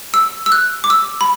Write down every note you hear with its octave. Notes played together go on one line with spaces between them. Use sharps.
E6
E6
F#6
D6
E6
B5